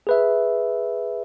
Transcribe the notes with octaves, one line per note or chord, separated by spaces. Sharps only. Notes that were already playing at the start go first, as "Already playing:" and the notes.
G#4 B4 E5